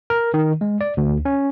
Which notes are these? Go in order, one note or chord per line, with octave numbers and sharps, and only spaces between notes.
A#4
D#3
G#3
D5
D2
C#4